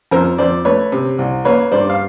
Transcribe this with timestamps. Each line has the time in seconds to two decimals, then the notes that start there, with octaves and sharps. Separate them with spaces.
0.11 F2 A#4 C5
0.38 F2 C5 D5
0.65 A3 B4 C#5
0.92 C3
1.18 C2
1.45 A#3 B4 C#5
1.72 G2 C5 D5
1.90 F5